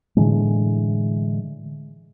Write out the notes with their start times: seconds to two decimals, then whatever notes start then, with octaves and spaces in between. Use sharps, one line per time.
0.17 A2 D3 E3 G#3